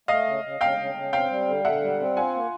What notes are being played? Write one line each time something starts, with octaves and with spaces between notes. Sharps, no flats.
A3 D#5 F5
C#3
C#3
C#3 F5 G5
C#3
C#3
C4 F5 G5
G3
D3
D3 E5 F#5
G3
C4
F4 F#5 G#5
A#3